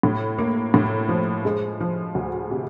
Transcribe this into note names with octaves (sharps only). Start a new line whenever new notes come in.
A2
A#3
A2
F3
G#3
F3
D2
C3